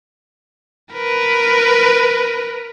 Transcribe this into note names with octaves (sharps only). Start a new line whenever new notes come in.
A#4 B4